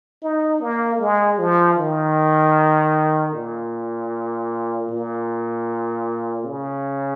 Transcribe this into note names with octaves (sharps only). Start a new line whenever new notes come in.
D#4
A#3
G#3
F3
D#3
A#2
A#2
C#3